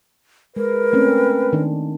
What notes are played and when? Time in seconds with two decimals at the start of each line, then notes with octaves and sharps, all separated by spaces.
0.56 G#3 A#4 B4
0.93 A3 C4 C#4
1.53 D#3 D4